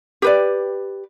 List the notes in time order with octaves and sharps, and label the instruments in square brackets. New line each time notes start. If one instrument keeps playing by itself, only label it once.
[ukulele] G4 B4 D5